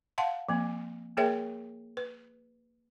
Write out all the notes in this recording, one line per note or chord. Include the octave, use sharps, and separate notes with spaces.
F5 F#5 A5 C6
F3 A#3 C4
A#3 G#4 A#4 C#5 E5 G5
B4